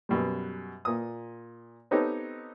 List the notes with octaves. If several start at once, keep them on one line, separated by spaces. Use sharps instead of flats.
F#2 B2 G3
A#2 D#6
B3 C4 D#4 G4 A4 C#5